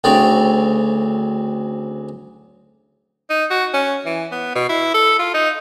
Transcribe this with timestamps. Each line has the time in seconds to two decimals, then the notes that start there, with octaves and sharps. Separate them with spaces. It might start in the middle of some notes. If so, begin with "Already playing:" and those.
0.04 D2 C#3 C4 D5
3.30 D#4
3.50 F#4
3.74 C#4
4.06 E3
4.32 B3
4.55 B2
4.69 E4
4.94 A4
5.19 F4
5.34 D#4